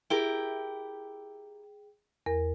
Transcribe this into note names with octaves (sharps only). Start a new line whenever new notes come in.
E4 G4 G#4 A#4 G5 G7
E2 A#4